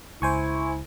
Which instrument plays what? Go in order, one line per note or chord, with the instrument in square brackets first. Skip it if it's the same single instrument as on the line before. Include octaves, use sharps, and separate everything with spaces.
[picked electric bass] C#2 [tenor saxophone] E4 [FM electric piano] C5 G#5 C#6